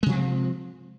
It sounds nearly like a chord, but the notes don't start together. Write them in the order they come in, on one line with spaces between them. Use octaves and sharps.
G#3 C3 F3 C4